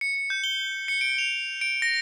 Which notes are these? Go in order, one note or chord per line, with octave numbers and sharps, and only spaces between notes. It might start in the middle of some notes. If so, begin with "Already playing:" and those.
C#7
G6
G7
C#7
D7
F7
D7
A#6